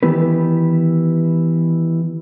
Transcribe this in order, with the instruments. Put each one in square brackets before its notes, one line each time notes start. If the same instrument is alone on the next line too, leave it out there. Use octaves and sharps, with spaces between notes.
[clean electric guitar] D#3 E3 B3 E4 G4 B4